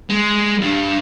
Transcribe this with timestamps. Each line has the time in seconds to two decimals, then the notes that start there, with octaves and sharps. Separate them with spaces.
0.10 G#3
0.61 G2